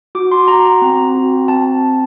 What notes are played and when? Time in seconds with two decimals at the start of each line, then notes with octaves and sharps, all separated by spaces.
0.15 F#4 D6
0.31 C6
0.48 F#4 A#5
0.65 A#5
0.82 C4
1.15 F#4
1.48 C4 A5